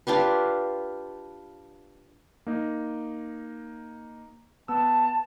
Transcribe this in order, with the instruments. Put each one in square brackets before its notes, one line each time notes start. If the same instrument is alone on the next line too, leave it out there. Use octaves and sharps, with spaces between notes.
[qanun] D4 F4 G4 B4
[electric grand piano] A#3 D#4
[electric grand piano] B3 E6 [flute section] A5